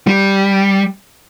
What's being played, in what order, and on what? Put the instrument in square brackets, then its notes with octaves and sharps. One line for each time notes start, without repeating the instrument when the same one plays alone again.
[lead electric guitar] G3